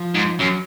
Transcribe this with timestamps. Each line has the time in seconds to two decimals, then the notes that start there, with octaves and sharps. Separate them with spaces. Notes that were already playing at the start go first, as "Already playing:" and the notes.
Already playing: F3
0.15 G#2
0.40 F#2 F#3